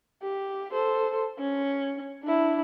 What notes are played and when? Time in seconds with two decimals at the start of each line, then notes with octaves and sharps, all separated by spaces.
0.22 G4
0.71 A4 C5
1.39 C#4
2.23 D4 E4